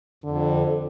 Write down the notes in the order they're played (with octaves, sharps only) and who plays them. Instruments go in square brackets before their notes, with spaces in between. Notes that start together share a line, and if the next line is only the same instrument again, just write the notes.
[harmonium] F2 [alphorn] D3